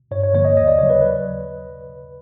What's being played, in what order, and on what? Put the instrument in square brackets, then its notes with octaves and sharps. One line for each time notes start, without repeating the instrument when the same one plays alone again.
[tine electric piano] G2 C#5
C#5
D3 F3 A#3 C#5
D#5
D#2 D#5
D5
C#3 F#3 C#5
B4
B4